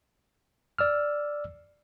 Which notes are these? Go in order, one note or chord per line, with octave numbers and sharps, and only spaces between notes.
D5 E6 F6